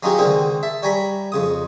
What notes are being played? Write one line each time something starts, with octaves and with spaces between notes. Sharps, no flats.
F#3 C#4 D#4 F4 G4 G#4
C#2 D3 D#3 C4 G#4
E5 A5
G3 C#5 G#5 A#5 B5
F2 C#3 D#6